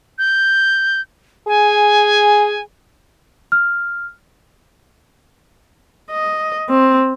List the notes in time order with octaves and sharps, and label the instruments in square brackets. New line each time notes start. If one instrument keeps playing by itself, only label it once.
[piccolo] G6
[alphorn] G#4 [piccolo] G#5
[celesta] F6
[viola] D#5
C4